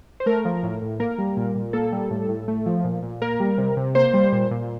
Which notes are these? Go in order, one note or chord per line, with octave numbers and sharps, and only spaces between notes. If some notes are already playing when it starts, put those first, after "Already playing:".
C5
A3 A#4
F3
A2
A2
A#3 A#4
G3
A#2
A#2
A#3 A4
G3
A2
A2
A3
F3
A#2
A#2
A#3 A#4
G3
C3
C3
A#3 C5
G3
A#2
A#2